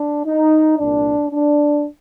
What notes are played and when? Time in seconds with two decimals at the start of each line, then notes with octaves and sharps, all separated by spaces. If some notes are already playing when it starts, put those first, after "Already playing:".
Already playing: D4
0.26 D#4
0.78 C2 A#2 D4
1.30 D4